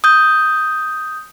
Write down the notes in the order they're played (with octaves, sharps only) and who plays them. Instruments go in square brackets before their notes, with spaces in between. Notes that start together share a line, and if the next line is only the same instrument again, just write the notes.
[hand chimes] D#6 G6